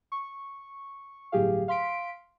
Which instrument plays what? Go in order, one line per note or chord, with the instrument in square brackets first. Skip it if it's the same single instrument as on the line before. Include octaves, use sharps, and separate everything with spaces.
[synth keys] C#6
G1 A2 F#3 G4 G#4 F5
F5 C6 B6 D7